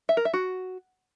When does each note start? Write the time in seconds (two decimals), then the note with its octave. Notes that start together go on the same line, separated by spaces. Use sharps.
0.09 E5
0.17 A#4
0.25 E5
0.33 F#4